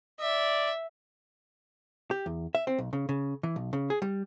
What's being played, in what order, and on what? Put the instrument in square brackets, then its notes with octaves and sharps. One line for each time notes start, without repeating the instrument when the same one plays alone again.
[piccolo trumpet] D5 [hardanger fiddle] E5
[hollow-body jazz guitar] G4
E2
E5
C4
B1
C#3
C#3
E3
B1
C#3
G#4
G3